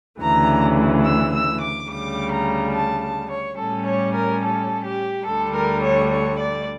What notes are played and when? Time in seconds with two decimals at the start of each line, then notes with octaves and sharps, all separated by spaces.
0.20 D2 C#3 E3 A#5
1.05 E6
1.33 E6
1.61 D6
1.89 D2 C#3 G3 D6
2.31 A#5
2.74 A5
3.02 A5
3.30 C#5
3.58 A2 G3 C#4 A4
3.86 C#5
4.14 A#4
4.43 A4
4.85 G4
5.26 D2 D3 G3 A4
5.55 A#4
5.82 C#5
6.10 C#5
6.39 D5